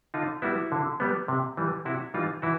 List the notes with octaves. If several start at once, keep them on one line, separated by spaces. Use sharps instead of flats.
D3 D#4 F4
G3 B3 E4 F#4
D3
G3 B3
C3
E3 G3
C3 E4 F#4
E3 G3 D#4 F4
E3 E4 F#4